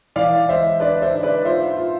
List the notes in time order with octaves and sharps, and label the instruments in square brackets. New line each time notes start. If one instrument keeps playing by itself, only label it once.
[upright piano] E3 [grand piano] D5 F5
[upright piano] G#3 [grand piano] C5 E5
[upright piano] D4 [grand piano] B4 D5
[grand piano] C5 E5
[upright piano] G#2 [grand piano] E5
[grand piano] B4 D5
[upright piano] F4 [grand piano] C5 E5
[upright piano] F4